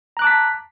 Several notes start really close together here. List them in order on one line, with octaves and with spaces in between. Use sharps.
A#5 F#6 D6 A5 B6